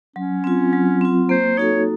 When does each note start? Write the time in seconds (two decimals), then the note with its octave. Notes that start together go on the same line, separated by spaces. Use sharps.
0.16 F#3 C#4
0.44 C4 F4
0.73 F#3
1.01 C4 F4
1.29 A#3 C5
1.57 D#4 F#4 A4 C#5